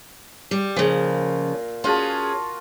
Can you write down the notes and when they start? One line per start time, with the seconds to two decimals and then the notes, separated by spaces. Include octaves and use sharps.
0.51 G3
0.76 A#2 C#3 F3
1.84 C#4 F4 F#4 G#4 A5